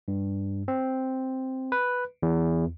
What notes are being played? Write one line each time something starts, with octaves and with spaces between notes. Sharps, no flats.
G2
C4
B4
E2